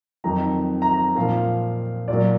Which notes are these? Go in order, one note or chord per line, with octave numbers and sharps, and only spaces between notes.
F2 D#3 F#3 A#5
A#5
A#5
A#2 F3 F5
A#2 F#3 D5